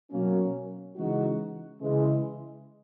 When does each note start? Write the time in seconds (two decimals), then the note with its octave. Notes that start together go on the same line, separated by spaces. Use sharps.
0.11 B2 F#3 A#3 C#4
0.96 C#3 E3 G#3 D#4 F#4
1.81 C#3 E3 G#3